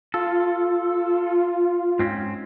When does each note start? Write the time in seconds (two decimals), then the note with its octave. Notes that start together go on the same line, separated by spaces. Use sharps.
0.14 F4 A4
1.99 G#2 C4 C#4